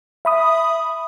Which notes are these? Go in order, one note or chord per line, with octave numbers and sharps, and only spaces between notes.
E5 B5 D#6